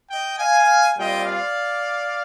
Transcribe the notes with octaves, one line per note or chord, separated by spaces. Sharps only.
D#5 G5
F5 G#5
A#2 G3 C4 F4 D#5 G5
D5 F5